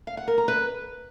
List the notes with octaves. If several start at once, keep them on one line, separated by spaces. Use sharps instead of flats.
F5
F#5
A#4
A#5
B4